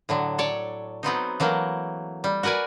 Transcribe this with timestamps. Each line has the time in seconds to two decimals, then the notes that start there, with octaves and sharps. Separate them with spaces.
0.09 A2 D3 F#3
0.38 A4 C#5 D5
1.03 F#3 B3 C4 D#4
1.40 E3 F#3 A3 A#3
2.24 G3
2.43 F#4 A#4 B4 D5 G#5